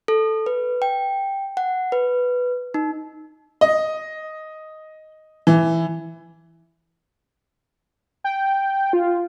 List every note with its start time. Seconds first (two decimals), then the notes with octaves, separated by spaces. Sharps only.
0.08 A4
0.46 B4
0.82 G5
1.57 F#5
1.92 B4
2.74 D#4
3.61 D#5
5.47 E3
8.24 G5
8.93 F4